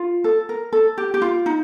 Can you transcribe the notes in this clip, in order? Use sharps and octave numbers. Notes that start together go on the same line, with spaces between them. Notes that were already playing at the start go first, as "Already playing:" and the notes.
Already playing: F4
A4
A#4
A4
G4
G4
F4
D#4